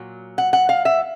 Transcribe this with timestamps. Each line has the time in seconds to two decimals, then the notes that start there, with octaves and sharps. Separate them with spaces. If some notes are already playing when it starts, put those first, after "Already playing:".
Already playing: A#2 F#3
0.38 F#5
0.53 F#5
0.69 F5
0.85 E5